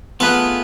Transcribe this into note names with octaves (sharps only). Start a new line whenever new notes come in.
A3 B3 F4 G#4 B4